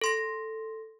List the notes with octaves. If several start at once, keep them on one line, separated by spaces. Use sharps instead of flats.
A4 C6 A#6